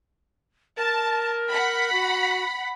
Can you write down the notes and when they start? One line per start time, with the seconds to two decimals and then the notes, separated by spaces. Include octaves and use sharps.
0.77 A#4 A5
1.51 F#5 B5
1.92 F#4